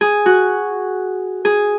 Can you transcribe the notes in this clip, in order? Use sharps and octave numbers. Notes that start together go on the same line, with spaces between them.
G#4
F#4
G#4